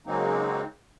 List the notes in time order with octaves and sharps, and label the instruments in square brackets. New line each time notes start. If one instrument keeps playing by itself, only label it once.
[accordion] C#3 F#3 G#3 A#3 C4 D#4